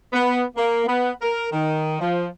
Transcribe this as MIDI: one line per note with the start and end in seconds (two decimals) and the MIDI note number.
0.13 0.43 59
0.56 0.84 58
0.87 1.10 59
1.21 1.47 70
1.52 1.96 51
2.00 2.26 53